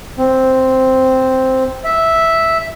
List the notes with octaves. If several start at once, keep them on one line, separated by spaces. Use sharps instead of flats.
C4
E5